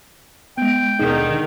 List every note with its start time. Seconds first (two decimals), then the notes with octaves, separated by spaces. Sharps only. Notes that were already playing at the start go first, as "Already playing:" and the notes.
0.57 G#3 B3 G5
0.99 D#2 B2 D3 D#3 D#4 G#4